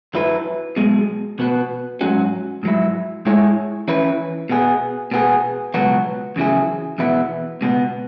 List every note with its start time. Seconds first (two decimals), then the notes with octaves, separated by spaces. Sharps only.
0.14 F#2 F#3 E4 B4
0.76 B1 B2 G#3
1.39 B2 B3 F#4 B4
2.01 G#2 F#3 C#4 F#4
2.63 G#2 F#3 E4
3.25 G#2 G#3 E4 G#4 C#5
3.88 E3 C#4 E4 B4
4.49 B2 B3 G#4
5.11 B2 B3 G#4
5.74 C#2 B2 F#3 B3 F#4
6.36 E2 C#3 F#3 E4 G#4
6.98 E2 B2 B3 E4
7.61 C#2 B2 B3